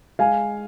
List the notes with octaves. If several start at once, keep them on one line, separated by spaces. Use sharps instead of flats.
G#3 F5 G#5